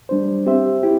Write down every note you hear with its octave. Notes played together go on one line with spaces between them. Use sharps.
G3 D4 C5
C4 G4 C5 E5
E4 G4